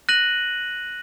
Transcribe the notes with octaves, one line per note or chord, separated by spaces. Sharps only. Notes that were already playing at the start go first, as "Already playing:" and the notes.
F#6 A#6 D#7 F#7